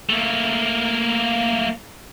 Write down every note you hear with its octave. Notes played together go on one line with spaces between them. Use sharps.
A3 A#3